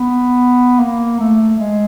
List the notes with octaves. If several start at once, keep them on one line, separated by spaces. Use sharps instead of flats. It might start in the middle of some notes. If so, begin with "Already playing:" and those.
Already playing: B3
A#3
A3
G#3